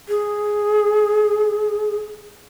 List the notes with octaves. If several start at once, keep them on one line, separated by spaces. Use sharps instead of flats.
G#4